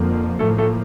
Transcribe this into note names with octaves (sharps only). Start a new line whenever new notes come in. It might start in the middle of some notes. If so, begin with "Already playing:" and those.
Already playing: F2 D3 F3 A#3
A2 F3 A3 A#3 A4
A3 A4